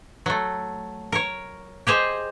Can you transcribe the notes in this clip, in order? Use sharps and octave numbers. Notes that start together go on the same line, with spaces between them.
F#3 A3
A#4 C#5
G4 G#4 C5 D#5